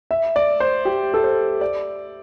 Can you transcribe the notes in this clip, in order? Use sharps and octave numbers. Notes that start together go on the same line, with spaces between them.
E5
D5
C5
G4
A4
C5
D5